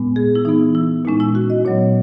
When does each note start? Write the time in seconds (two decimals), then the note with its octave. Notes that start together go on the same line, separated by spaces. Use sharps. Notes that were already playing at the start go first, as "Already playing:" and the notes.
Already playing: A#2 G#3 B3
0.16 G#4
0.35 E4
0.45 E3 B3 D#4
0.75 E4
1.05 A#2 G#3 C#4 D#4
1.20 E4
1.35 F#4
1.50 D#5
1.65 A#2 F#3 B3 C#5